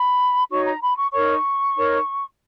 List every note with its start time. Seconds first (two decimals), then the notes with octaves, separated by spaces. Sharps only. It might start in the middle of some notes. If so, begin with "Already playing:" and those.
Already playing: B5
0.49 D#4 F#4 C#5 C#6
0.65 A#5
0.82 B5
0.97 C#6
1.12 D#4 A#4 C#5 C#6
1.76 D#4 A#4 C#5